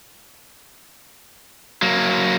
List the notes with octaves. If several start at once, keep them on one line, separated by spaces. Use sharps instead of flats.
F#3 A#3